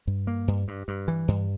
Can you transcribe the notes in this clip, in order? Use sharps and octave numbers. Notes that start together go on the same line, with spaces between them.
G2
A#3
G2
G2
G2
E3
G2